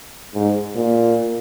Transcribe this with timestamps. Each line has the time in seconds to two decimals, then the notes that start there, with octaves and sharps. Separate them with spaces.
0.34 G#2
0.76 A#2